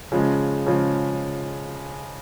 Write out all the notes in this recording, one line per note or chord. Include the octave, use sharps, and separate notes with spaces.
C#3 F3 G#3
C#3 F3 G#3